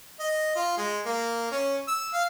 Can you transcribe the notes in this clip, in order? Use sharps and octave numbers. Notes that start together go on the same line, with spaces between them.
D#5
F4
G#3
A#3
C#4
E6
F5